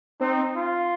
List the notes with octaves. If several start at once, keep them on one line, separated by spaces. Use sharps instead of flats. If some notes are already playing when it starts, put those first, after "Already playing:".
C4 D#4
F4